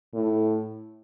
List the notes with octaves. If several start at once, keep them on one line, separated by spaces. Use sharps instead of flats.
A2